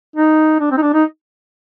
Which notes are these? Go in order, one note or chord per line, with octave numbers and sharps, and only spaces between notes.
D#4
D4
C4
D#4
D4
D#4